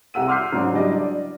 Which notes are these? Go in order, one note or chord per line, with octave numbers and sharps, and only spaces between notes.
C2 F#5 E6 D#7
C6 D6 F6 G6 C7
G#2 C#3 F#3 D4
F#3 G3 D4 E4 D5 D#5
D5